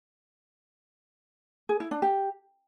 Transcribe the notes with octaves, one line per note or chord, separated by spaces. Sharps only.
G#4
E4
D4
G4